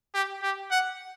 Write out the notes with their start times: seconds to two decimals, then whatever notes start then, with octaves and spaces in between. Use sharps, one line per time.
0.14 G4
0.43 G4
0.71 F#5